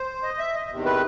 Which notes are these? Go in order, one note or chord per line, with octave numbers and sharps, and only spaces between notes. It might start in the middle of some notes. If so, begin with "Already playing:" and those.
Already playing: C5
D#5
E5
D#5
E2 C3 D#3
B4